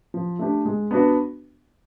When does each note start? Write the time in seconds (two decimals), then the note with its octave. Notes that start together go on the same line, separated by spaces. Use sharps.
0.14 F3
0.39 A3 D4 G4
0.65 G#3
0.91 B3 D4 F#4